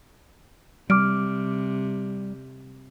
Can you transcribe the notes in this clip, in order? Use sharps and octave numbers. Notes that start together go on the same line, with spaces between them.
C3 G3 D6 F6 D7